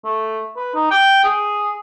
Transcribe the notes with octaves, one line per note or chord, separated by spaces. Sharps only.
A3
B4
D#4
G5
G#4